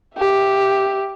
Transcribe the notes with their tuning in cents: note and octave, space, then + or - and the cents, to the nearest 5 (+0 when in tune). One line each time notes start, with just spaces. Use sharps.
G4 +0 E5 +0